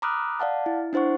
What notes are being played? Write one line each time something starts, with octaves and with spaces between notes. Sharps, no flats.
A#5 B5 D6 D#6 F6 F#6
D5 F5 F#5 A5
E4
D4 E4 C5 F#5 C#6